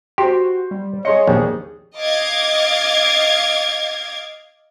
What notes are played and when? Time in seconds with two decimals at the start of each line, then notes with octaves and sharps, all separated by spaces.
0.18 F#4 G4 C5 C6
0.71 G3
1.05 G#4 C#5 D#5 C6 C#7
1.27 A#1 D#2 G#4
1.99 D#5 F5 D6 G#6 A6